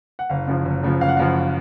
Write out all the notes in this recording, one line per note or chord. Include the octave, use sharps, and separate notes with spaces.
F#5
F#1 F5
F#2 C#3 F3
F#1
F#2 C#3 F3
F#1 F5
F#5
F#2 C#3 F3 F5